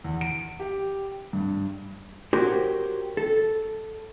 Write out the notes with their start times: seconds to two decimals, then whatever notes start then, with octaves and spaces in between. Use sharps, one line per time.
0.04 E2
0.21 D7
0.60 G4
1.33 G2
2.33 F#4 G4 A#4 C5 C#5
3.17 A4